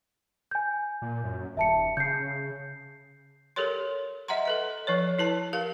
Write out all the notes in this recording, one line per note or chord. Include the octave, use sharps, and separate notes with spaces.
G#5 G6
A#2
F#2
D#1 E5 A5 C#7
C#3 G6 C7
G4 A4 A#4 C#5 C6
D#5 E5 F#5 A#5 C6
A4 B4 D#5
F3 A4 B4 C#5
E4 B4 A5
G4 A#4 F5